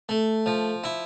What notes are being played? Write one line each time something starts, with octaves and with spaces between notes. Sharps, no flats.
A3
F3
E4